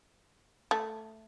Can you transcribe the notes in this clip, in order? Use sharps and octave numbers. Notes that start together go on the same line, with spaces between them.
A3